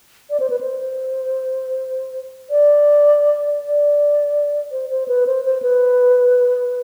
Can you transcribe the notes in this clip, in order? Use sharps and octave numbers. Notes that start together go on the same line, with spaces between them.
D5
C5
B4
C5
D5
D5
C5
C5
B4
C5
C5
B4